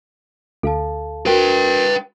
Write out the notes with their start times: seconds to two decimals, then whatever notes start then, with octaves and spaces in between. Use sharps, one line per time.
0.63 D2 A4 F5 A5
1.26 F#4 A#4 B4 G5